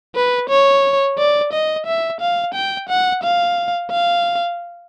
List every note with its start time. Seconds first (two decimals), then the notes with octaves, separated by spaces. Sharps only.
0.15 B4
0.50 C#5
1.18 D5
1.53 D#5
1.87 E5
2.21 F5
2.54 G5
2.89 F#5
3.23 F5
3.91 F5